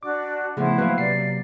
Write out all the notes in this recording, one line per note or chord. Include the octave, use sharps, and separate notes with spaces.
D4 F#4 D5 D6
A2 C#3 F3 B3 E4 C5 F#5
F#3 A#3 F#4 B4 F5
C3 D5 C7